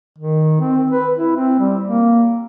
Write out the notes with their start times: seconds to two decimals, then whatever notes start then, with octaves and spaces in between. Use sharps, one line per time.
0.18 D#3
0.61 C4
0.91 B4
1.17 E4
1.36 C4
1.60 G3
1.84 A#3